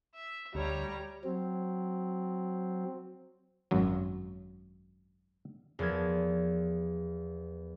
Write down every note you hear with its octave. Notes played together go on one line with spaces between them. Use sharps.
E5
D2 G3 C#5 A#5
F#3 C4
G#1 F#2 F#3
E2 F3 B3 A#4 G#6